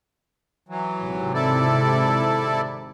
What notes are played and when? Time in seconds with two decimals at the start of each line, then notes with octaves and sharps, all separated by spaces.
0.68 E3 F#3
0.99 G#1 C3
1.34 E4 A4 D5